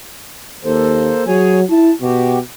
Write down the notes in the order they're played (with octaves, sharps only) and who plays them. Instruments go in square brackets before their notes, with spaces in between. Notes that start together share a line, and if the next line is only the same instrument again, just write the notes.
[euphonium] D#2 [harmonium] A#3 A4 C5
[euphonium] F#3 [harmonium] G#4 C#5 G#5
[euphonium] E4 [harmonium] A5
[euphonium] B2 [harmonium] F#4 G4